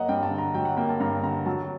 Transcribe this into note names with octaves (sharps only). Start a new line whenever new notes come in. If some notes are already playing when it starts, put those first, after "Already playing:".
Already playing: F#3 A#3 D#5 F#5 A#5
G2 G5
A5
D3
A#5
F#3 G5
F#5
A#3 G5
A5
G2 A#5
D3 A#5
F#3 A5